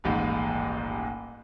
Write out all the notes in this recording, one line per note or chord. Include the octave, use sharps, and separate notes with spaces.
D#1 A1 G#2